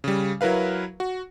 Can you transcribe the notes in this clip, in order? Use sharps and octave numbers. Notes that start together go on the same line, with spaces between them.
C#3 G3
F#3 E4 A#4 B4 F5
F#4